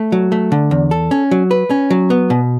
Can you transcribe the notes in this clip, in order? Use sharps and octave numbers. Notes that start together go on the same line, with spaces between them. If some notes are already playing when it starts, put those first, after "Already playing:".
Already playing: A3
F#3
A3
D3
E2
A4
C#4
F#3
B4
C#4
F#3
B3
B2